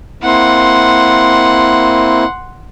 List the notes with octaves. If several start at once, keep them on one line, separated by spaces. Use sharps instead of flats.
A#3 C4 E4 F#5 C6